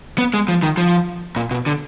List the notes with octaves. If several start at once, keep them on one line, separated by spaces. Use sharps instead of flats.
B3
G#3
F3
D#3
F3
A#2
B2
D3